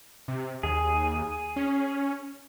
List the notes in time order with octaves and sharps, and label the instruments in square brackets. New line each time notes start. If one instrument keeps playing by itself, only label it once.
[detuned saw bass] C3
[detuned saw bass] D#2 [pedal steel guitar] G#4
[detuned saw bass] C#4